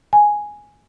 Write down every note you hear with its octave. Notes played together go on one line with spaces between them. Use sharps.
G#5